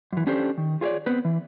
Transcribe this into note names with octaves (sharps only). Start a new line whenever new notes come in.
F#2 E3
C#4 D4 G4 A4 C5
D#3
F4 G#4 B4 C#5 D5
B3 C4 B4
E3